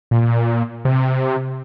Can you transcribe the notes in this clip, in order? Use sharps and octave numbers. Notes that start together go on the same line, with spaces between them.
A#2
C3